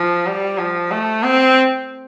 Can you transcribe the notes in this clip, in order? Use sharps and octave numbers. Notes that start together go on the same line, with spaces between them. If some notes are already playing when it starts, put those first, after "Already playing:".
Already playing: F3
G3
F3
A3
C4